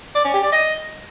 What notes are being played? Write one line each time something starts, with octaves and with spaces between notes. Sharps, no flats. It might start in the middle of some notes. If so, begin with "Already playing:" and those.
D5
C#4
G4
D5
D#5